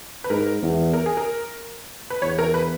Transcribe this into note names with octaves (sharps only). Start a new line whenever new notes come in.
B4
G#2 A#4
E2
A#4
G#4
A#4
B4
E2 C#5
A#4
B4